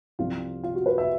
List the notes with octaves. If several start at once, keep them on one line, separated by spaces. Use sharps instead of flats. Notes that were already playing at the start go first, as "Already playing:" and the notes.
C2 C3 F3 F4
F4
F#4
B4
E5